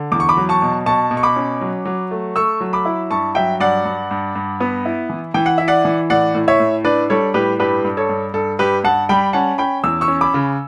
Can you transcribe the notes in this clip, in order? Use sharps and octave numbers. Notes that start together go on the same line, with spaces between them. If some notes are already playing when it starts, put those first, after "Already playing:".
Already playing: D3
E2 D6
C#6
B5 D6
F#3
A5 C#6
B2
B2 A5 C#6
B2
C#6
B5 D6
C#4
F#3
F#3
A3
A3 C#6 E6
F#3
B5 D6
E4
G2 A5 C#6
F#3 E5 G5
G2 D5 F#5
G2
G2
G2
B3
E4
E3
E3 G5
F#5
E4 E5
D5 F#5
E3
A2 D5 F#5
A2
C#5 E5
A2
D4 B4 D5
G3 A4 C#5
A2 G4 B4
G2 G4 B4
G2
A4 C#5
G2
G2 A4
G2 G4 B4
G2 F#5 A5
G3 G5 B5
C#4 F#5 A5
C#4 G5 B5
E2 E6
C#6 E6
C#4
B5 D6
C#3